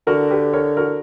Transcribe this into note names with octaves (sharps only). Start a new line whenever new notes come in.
D3 F#4 A#4
G4 B4
A#4 C#5
F#4 A#4